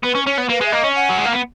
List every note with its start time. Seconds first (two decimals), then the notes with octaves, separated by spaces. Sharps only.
0.04 B3 B4
0.15 C#4
0.26 C#4 C#5
0.38 B3
0.49 A#3 B4
0.61 G#3 E5
0.72 A#3 D#5
0.84 C#4
0.96 F#5
1.10 F#3
1.17 G#3
1.26 A#3
1.33 B3